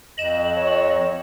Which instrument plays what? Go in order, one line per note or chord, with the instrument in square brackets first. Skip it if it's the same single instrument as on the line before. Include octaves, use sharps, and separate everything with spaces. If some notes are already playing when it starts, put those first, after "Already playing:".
[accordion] F2 [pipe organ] D#5 [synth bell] E7 F#7
[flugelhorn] C#5